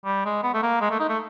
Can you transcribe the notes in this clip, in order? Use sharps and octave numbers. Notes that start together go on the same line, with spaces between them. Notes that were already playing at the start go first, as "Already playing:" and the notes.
G3
G#3
B3
A3
A#3
G#3
A3
D#4
A3